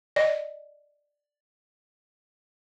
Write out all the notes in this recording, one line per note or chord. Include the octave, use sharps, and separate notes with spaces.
D5 D#5